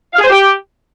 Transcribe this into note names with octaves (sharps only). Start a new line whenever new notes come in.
F5
G#4
C5
G4